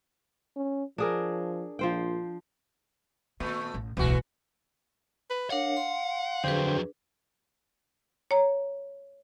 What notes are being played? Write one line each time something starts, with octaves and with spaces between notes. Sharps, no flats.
C#4
F3 D4 G#4 A#4
A#1 F3 C5 G5
A#2 D#3 A3
A1
D1 B1 E3 F#4
B4
D4 A#4 C#5 F5 F#5
C6
F2 D3 F#3 D4 G#4 B4 C5 G5
C#5 A#5